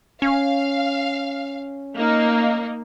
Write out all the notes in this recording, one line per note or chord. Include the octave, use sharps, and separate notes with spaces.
C#4 F5
A#3 D#4